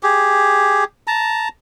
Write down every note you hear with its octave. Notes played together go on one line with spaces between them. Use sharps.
G4 G#4
A5 A#5